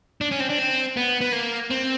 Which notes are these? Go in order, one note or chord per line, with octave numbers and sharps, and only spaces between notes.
D4
C#4
C4
D4
C4
B3
B3
A#3
C4